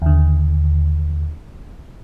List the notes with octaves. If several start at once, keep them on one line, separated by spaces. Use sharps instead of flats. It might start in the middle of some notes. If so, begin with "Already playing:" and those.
D#2 D3